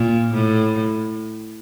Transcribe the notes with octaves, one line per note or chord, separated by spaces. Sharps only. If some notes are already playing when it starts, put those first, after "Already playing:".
Already playing: A#2
A2